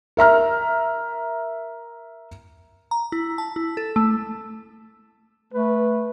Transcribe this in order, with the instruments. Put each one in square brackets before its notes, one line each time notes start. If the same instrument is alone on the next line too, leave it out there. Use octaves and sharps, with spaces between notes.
[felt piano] A#4 E5 A#5 F6
[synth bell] A#5
E4
A5
E4
A4
A3
[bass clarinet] A3 [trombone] B4